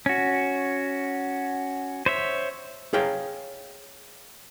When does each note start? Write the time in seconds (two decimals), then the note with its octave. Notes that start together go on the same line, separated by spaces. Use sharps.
0.06 C#4 F#4
2.06 C5 C#5 E5
2.93 G#4 C#5 F5 G5